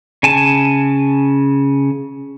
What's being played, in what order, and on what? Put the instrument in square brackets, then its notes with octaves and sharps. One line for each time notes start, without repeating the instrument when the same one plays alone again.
[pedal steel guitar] C#3 G#5 A5